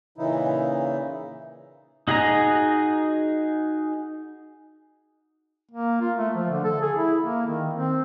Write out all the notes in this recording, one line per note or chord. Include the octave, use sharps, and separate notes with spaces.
A#2 C#3 E3 D#4 E4
D#4 F#4 G#4 D#5 A#5
A#3
F4
A3
F3
D3
A4
G#4
E4
A#3
D#3
C4